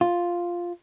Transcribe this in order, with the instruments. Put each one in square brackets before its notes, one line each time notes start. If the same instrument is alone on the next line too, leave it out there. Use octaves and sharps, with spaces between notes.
[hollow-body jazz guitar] F4